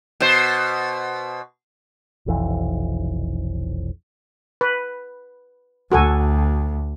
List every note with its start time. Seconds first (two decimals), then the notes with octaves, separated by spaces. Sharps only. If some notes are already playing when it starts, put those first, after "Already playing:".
0.20 B2 C5
2.26 F1 B1 F2 E3
4.61 B4
5.92 D2 F#4 A4 G#5